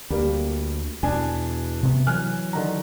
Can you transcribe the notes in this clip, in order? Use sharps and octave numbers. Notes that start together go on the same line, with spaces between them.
D2 G3 A#3
E2 B2 D4 G#5
C3 A3 B3
E3 F#3 G#5 F6 F#6
D3 D#3 A#5